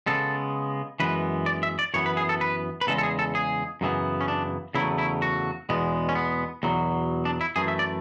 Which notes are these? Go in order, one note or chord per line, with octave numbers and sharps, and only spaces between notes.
C#3 G#3 B3 A4
F#2 E3 G#3 B3 B4
D5
E5
D5
F#2 E3 B3 C#5
B4
G#4
A4
B4
B4
E2 C#3 G#3 A4
A4
G#4
A4
G#4
F#2 C#3 E3 B3
C#4
D4
E2 C#3 F#3 A3 E4
E4
F#4
E2 B2 G#3 B3
C#4
B3
E2 B2 F#3
D4
E4
F#2 E3 A3 G#4
E5
D5